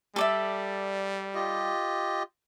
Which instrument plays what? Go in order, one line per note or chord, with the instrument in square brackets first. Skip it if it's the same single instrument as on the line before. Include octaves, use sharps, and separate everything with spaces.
[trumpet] G3 [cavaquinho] A4 D5 E5
[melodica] F4 G4 D#5